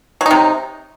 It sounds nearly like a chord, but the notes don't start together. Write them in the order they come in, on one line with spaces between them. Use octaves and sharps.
F#3 D#4 C3